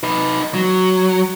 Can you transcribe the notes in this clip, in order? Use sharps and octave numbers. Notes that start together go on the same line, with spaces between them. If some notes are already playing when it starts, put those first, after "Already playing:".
D#4 B4
F#3